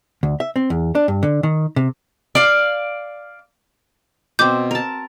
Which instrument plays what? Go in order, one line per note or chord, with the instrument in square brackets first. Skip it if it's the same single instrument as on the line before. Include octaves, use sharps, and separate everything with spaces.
[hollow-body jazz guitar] D2
E5
C4
E2
D4
G2
D3
D#3
C3
[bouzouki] D5 F5
[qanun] B2 C4 [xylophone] D6 G6
[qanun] A#4 A5